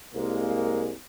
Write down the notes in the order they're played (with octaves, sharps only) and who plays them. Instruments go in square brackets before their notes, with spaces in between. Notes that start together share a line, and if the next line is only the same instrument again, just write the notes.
[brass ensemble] C2 G#3 A#3